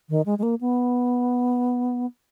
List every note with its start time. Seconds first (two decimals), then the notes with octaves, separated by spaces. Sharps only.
0.09 D#3
0.26 G#3
0.39 G#3
0.43 A#3
0.61 B3